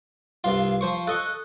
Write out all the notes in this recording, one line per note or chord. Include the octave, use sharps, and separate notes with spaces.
C2 G2 F4 F5
F3 C5 C#6
A4 D#5 C#6 F#6